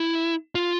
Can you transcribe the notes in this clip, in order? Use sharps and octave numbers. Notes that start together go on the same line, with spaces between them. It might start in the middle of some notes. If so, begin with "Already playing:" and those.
Already playing: E4
F4